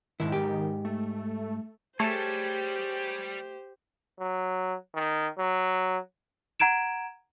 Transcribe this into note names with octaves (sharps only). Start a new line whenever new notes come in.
G#2 D#3 E4
G#2 G4
A3
G3 A3 G4 G#4 C5 C#5 A5
F#3
D#3
F#3
F#5 A#5 G#6 D7 E7